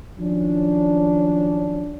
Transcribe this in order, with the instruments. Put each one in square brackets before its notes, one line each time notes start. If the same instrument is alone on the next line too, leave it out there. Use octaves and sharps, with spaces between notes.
[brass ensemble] D#3 F3 F#3 C#4 D4